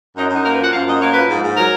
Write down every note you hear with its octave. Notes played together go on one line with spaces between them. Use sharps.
F#2 D#4
F#2
D#4
A#3 A#4
B4
F3
F#5
F#2 F5
F#2 D#5
A#3 C#5
F3 B4
G#2
G#2
F#3 A#4